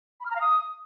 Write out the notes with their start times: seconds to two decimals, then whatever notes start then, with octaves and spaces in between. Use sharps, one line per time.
0.20 B5
0.25 F6
0.30 A#5
0.36 F5
0.41 D#6